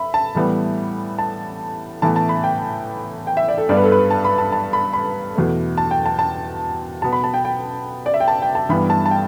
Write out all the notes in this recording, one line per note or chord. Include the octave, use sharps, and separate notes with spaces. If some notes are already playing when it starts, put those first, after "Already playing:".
Already playing: E5 B5
A5
A2 E3 G3 B3
A5
A2 E3 B3 A5
A5
B5
G5
G5
E5
D5
A4
G2 G3 B3 D5
B4
A4
B4
A5
B5
A5
A5
B5
B5
E2 B2 A3
A5
G5
A5
A5
B2 B3 A5
B5
A5
G5
G5
D5
E5
G5
A5
G5
A5
G2 E3 G3 B3 B5
A5
A5
G5